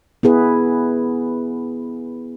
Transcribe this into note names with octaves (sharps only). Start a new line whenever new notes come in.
B3 E4 G#4 B4